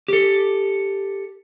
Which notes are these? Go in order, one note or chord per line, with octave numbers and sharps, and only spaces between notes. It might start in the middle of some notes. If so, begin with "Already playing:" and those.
G4 A4